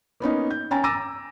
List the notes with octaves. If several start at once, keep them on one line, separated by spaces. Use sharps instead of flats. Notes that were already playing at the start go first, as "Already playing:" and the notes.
A#3 B3 C#4 D#4
G6
C#4 G5 G#5 A#5 A6
A#5 D6 E6 A6 A#6 D#7